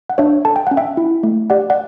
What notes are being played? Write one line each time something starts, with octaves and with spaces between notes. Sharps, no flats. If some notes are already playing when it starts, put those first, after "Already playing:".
F#5
D4 C#5 E5
A4 A5
G5
C#4 F#5
E5 G5
E4
A3
G4 D5 F#5
D5 F#5